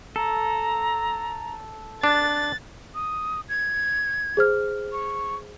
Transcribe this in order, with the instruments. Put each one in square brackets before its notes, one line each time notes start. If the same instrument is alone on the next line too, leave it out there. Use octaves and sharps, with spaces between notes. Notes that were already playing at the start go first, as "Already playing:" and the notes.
[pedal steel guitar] A4 [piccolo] A#5
[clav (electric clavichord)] D4 [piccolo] F#6 [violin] A6
[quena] D#6
G#6
[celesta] G#4 C5 F6
[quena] C#6